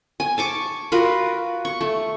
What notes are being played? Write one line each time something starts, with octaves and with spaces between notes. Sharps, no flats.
G#5
A5 C#6 D6
F4 F#4 A#4 B4
C#6
A3